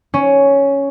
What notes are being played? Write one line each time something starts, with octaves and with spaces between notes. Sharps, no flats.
C#4